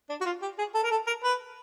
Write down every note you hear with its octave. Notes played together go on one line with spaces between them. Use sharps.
D4
F#4
F4
G4
G#4
A4
A#4
A4
A#4
B4